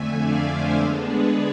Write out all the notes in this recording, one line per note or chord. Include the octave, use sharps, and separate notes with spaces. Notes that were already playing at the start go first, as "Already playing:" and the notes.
Already playing: F2 D3 A3 E5 G#5
D5 F5
C5 E5
D3 G#3 B3 D4 B4 D5
G#4 B4